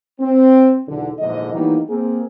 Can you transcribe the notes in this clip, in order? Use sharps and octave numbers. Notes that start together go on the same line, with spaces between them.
C4
B1 E2 D3
A#1 E2 G#2 D3 D#5
E3 F#3 G3 A#3 B3 D#4
A#3 C4 G#4